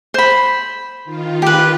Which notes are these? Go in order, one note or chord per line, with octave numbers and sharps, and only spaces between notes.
C5 B5
D#3 F4
G4 B4